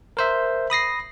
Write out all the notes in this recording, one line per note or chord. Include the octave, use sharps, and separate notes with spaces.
A#4 C5 E5
B5 D#6 A#6 C7